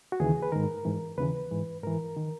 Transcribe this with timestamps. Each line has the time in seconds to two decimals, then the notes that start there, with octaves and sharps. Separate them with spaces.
0.12 F#4
0.20 D#2 C#3 E3 G#4
0.42 B4
0.52 G#2 D#3 A#4
0.85 G#2 E3
1.18 D#2 C#3 E3 B4
1.51 G#2 E3
1.83 G#2 E3 A#4
2.17 D#3